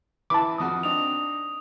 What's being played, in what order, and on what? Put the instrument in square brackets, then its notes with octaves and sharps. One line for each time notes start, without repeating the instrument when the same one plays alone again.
[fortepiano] E3 E4 B4 [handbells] A5 D6
[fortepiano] F2 F3 F#4 [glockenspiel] D#6
[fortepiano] C4 D4 D#4 [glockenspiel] D#6 F7